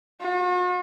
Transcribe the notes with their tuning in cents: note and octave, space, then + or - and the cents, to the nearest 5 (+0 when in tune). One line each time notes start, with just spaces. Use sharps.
F#4 -45